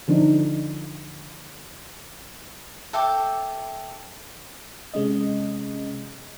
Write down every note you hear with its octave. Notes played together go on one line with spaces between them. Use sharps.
D3 F3 D4 D#4
A4 E5 G5 D6
C3 G#3 C#4 D#5